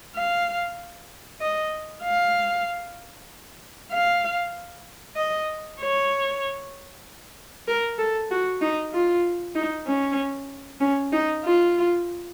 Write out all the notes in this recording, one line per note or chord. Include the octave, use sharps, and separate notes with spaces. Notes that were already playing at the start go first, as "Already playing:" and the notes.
F5
D#5
F5
F5
D#5
C#5
A#4
A4
F#4
D#4
F4
D#4
C#4
C#4
D#4
F4